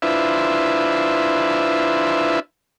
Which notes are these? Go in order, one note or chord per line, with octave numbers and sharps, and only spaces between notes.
D4 E4 F4 B4 C5 E5